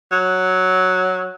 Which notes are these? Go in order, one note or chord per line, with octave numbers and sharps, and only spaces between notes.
F#3